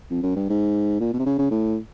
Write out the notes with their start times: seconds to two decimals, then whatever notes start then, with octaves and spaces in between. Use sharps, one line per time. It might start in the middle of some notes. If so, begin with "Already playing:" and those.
0.11 F2
0.23 F#2
0.36 G2
0.49 G#2
1.00 A#2
1.13 B2
1.19 C3
1.26 C#3
1.38 C#3
1.51 A2